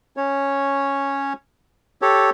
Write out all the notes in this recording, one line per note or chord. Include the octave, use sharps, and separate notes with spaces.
C#4 C#5
G4 A4 C#5